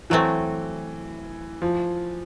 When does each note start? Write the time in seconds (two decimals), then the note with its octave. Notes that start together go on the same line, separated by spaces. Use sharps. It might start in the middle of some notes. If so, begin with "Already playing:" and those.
0.10 E3 F#3 A3 C4
1.62 F3